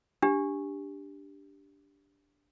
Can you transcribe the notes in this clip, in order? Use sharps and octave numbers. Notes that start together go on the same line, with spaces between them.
D4 G4